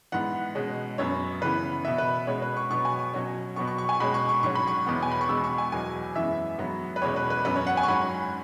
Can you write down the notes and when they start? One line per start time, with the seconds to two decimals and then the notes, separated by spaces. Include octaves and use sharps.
0.12 G#2 E3 B3 F#5
0.55 B2 G#3 C#4
0.98 F#2 F#3 B3 C#5
1.41 C#3 E3 B3 B4
1.85 B2 B3 E5
1.98 B4
2.27 B2 G#3 C#4 C#5
2.42 B4
2.57 C#6
2.71 B2 F#3 B3 C#6
2.85 G#5
3.00 C#6
3.13 B2 F#3 C#4
3.56 B2 F#3 B3 C#6
3.67 C#6
3.78 C#6
3.89 G#5
4.00 B2 G#3 C#4 B5
4.14 C#6
4.29 C#6
4.43 G#2 F#3 C#4 C#6
4.55 B5
4.67 C#6
4.86 E2 B2 B3
5.03 G#5
5.12 B5
5.21 C#6
5.29 B2 G#3 B3 E6
5.44 C#6
5.58 G#5
5.72 E2 B2 F#3 G#5
6.16 F#2 E3 G#3 B3 E5
6.58 G#2 F#3 B3
6.96 B4
7.02 E2 B2 G#3 C#4 C#5
7.16 B4
7.30 B4
7.45 F#2 F#3 B3 B4
7.56 C#5
7.67 F#5
7.77 G#5
7.83 C#6
7.88 G#2 F#3 C#4 B5